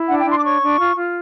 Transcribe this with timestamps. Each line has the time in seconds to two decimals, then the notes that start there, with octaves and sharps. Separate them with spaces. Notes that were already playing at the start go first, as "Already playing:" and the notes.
Already playing: E4
0.08 D4 F#5
0.21 G5
0.25 D4
0.32 C6
0.38 D6
0.43 C#5 C#6
0.62 D4
0.79 F4
0.96 F4